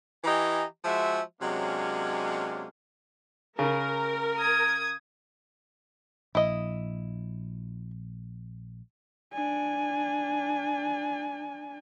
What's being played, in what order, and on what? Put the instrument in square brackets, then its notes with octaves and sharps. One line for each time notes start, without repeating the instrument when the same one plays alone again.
[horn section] E3 G4 D#5 G#5 A#5
F3 G#3 F#4 E5
C3 F#3 G#3 A#3 C#4 D4
[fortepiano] C#3 [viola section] A#4
[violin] D#6 G#6
[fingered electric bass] A#1 [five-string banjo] E4 D#5
[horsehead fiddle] D4 G#5